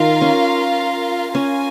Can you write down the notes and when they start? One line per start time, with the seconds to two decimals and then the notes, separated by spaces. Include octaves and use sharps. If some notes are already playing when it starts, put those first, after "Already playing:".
Already playing: D#3 F4 A#4 F5
0.21 C#4
1.34 C#4 F4 A#4 F5 G#5